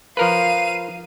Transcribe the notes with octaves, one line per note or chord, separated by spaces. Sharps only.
F3 A#4 B4 F5 D#7